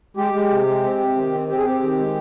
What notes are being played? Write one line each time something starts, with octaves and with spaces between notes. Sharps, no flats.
G#3 G4
G#3
C3
G#3
C4
C3
D#3
C4
C4 G4
G#4
C4 G4
D#3
G#3